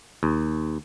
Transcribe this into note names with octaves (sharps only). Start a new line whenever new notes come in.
D#2